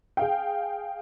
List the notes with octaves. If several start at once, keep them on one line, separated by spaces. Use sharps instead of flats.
G#4 F5 G5